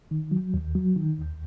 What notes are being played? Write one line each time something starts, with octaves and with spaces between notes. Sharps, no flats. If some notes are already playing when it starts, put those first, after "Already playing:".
D#3
F#3
D#2
F#3
D#3
D#2